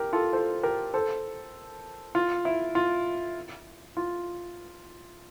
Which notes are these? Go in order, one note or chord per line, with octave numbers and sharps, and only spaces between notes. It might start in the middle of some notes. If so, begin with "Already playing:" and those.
Already playing: G4 A#4
F4 A4
A4 C5
G4 A#4
A4 C5
F4
E4
F4
F4